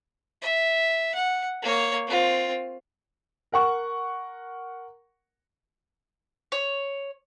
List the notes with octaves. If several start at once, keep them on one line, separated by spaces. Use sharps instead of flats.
E5
F#5
A#3 C#5
C4 F4
A#4 F#5 C#6
C#5